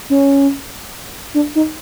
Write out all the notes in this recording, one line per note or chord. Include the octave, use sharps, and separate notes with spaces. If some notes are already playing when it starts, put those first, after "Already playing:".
C#4
D4
D#4